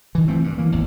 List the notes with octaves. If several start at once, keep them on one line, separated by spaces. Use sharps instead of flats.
D#3 E3
E3 F3 A3 C4
G2
E3 A#3
G#1 E2